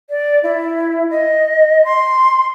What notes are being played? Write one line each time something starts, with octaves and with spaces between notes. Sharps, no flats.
D5
E4
D#5
C6